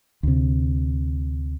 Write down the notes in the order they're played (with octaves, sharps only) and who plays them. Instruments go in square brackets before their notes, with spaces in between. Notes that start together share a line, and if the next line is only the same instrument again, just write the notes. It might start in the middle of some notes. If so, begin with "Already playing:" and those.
[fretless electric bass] D2 C3